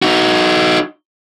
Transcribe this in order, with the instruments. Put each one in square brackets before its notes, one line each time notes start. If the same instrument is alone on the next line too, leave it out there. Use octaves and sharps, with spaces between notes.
[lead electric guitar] D#4 F#4